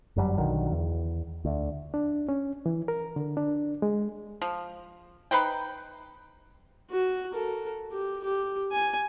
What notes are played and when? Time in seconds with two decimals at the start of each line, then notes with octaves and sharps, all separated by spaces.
0.16 G1 F#2 F#3 G3
0.37 B1 D3 D#3 F#3
0.72 E2
1.45 D2
1.94 D4
2.29 C#4
2.66 E3
2.88 A#4
3.16 D3
3.37 D4
3.82 G#3
4.42 F3
5.31 D#4 B4 C5 G5
6.91 F#4
7.32 A4 A#4
7.92 G4
8.24 G4
8.72 G#5